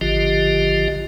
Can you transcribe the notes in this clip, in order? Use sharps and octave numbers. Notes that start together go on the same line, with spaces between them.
G#1 D3 F3 F4 G4 D#5